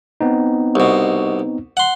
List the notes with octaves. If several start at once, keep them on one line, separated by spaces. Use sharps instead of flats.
B3 C4 D#4
C2 B2
F#5 C6